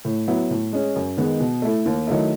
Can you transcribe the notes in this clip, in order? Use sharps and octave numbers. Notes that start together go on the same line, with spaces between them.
A2
F#3 B3 E4
A2
G#3 C#4
F#2
D#3 G#3 B3
B2
A3 E4 A4
D#2
D#3 F#3 A3 E4